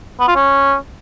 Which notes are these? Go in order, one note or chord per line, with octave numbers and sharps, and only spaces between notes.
B3
F4
C#4